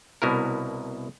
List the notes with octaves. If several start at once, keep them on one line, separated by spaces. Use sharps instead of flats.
C2 B2 E4 A#4